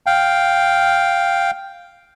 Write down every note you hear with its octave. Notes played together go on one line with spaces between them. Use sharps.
F5 G5